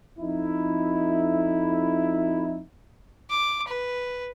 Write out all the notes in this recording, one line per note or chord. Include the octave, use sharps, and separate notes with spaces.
F2 D#4 E4
D6
B4